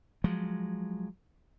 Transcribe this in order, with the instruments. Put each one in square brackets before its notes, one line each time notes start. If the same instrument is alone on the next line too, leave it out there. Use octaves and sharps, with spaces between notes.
[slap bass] F3 F#3 G#3